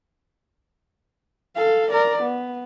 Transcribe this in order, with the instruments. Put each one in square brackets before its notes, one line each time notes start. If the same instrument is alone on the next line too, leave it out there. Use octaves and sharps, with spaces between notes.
[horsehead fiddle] A4 F5
A#4 D5
B3